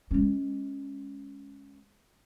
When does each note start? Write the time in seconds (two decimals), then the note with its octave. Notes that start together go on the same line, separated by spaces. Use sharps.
0.11 G#3 C#4